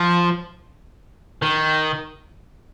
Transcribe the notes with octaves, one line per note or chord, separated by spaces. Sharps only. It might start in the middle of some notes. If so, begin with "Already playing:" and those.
Already playing: F3
D#3